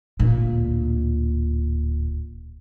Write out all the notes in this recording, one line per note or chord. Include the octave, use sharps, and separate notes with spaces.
D1 A#2